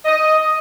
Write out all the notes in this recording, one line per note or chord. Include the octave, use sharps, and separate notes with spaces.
D#5